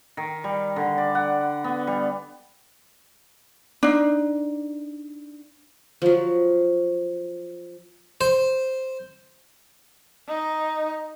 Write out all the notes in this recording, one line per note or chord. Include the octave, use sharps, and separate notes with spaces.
D#3
G3
D3
D5
F#5
B3
G3
D4 D#4
F3 F#3
C5
D#4